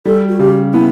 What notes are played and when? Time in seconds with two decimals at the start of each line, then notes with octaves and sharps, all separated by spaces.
0.05 G3 A4
0.29 F#4
0.39 C#3 G4
0.73 B3 E4